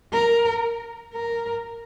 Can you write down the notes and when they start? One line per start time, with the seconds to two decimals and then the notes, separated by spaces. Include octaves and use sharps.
0.13 A#4
1.14 A#4